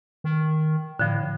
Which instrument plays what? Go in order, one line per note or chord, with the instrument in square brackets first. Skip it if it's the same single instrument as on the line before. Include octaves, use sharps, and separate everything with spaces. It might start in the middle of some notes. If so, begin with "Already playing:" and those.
[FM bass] D#3
[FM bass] A2 [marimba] D3 F3